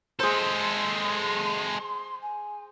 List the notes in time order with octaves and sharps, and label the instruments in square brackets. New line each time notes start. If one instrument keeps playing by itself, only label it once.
[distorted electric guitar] G#3 A4 [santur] G#4 C5 [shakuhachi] C6
[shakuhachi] G#5